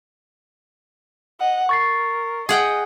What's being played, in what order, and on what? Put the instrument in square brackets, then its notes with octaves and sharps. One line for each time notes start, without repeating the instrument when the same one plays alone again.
[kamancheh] D#5 F#5
[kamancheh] A#4 [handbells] C#6 A6 C7
[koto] G#4 F#5 G5 [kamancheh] D#5